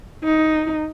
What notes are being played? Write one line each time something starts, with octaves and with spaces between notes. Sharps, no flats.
D#4